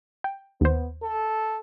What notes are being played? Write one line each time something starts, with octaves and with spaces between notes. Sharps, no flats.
G5
D#2 B3 C5
A4